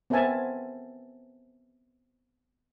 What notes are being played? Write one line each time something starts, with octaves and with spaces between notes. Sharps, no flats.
B3 C4 A#4 E5 G#5 A5